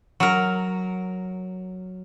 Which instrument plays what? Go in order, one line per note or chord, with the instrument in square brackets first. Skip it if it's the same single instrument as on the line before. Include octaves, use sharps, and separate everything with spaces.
[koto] F#3 A#4